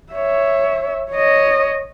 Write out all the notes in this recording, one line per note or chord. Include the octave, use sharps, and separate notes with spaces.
C#5 E5
C#5 D#5